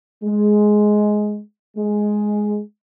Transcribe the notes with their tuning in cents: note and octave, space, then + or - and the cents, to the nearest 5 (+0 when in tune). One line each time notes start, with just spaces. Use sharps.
G#3 +10
G#3 +5